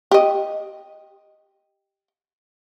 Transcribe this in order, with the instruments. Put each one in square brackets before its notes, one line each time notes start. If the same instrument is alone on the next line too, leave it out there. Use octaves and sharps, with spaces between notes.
[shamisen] G4 D#5